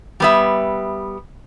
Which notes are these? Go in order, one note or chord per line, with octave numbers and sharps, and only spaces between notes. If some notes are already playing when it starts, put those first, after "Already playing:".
G3 B3 E5